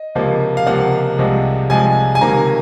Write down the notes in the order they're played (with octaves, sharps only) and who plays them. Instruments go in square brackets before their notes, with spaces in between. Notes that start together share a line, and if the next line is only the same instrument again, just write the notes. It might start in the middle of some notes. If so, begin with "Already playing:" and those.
Already playing: [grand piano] D#5
C#2 C3 F3 A#3
F5
C#2 C3 F3 A#3 F#5
C2 C3 F3 G#3
C2 C3 F3 G#3 G#5
G#5
C#2 C3 D#3 A#3 A#5